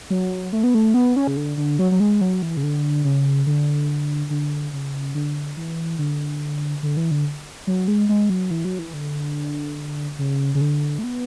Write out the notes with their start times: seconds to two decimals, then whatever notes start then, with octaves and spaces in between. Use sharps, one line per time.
0.10 F#3
0.53 A3
0.64 B3
0.74 A3
0.94 B3
1.16 C#4
1.27 C#3
1.37 D3
1.57 D3
1.79 F#3
1.92 F#3
2.00 G#3
2.21 F#3
2.42 E3
2.57 C#3
2.63 D3
3.04 C#3
3.47 D3
4.30 D3
4.73 C#3
5.15 D3
5.57 E3
5.99 D3
6.83 D3
6.97 E3
7.11 D3
7.67 F#3
7.88 G#3
8.09 G#3
8.30 F#3
8.51 E3
8.65 F#3
8.79 E3
8.94 D3
10.19 C#3
10.55 C#3
10.61 D3
10.99 A3
11.04 B3